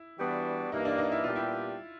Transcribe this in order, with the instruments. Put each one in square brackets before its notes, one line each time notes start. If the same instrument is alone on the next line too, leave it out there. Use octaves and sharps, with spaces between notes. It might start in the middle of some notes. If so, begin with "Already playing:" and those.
Already playing: [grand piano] E4
[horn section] E3 G3 B3 D4 F#4
[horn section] G2 E3 G3 A#3 [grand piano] D#4
[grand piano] D4
D#4
E4
[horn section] A#2 G3 B3 D4 G4 [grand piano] F4
[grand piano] E4